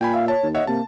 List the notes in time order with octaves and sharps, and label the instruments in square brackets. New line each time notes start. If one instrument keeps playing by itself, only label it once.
[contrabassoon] A#2 [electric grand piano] G5 G#5 B5
[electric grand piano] E5 [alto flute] F5
[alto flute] C#5 [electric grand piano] A5
[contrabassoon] D#2
[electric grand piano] C#5 E5 F#5 [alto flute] D#5
[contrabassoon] C3 [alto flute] A#3 [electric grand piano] A5